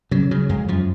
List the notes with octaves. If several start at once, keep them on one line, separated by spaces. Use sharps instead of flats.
C#3 F#3
C#3 F#3
F2 G#3
F#2 F3